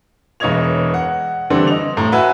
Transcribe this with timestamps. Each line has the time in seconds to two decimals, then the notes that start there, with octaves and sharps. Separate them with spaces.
0.40 E1 E3 C#5 D#5 G#6 F7
0.94 F#5
1.50 D3 E3 G3 C4 A4
1.67 D#5 F7
1.97 A2 A#5 C6
2.12 F#4 B4 E5 G#5